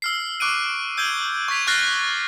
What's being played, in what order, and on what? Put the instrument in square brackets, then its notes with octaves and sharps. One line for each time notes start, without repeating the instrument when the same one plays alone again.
[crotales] E6 F6 C7
C#6 D6 F#6 D7 D#7
E6 G6 G#6 D#7 G7
C#6 E6 G#6 B6 C7 F7
C#6 F6 F#6 A6 A#6 C7